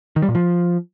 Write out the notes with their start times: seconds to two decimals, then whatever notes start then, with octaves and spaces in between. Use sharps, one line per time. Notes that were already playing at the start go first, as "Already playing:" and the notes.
0.16 D#3
0.22 G3
0.29 A#2
0.35 F3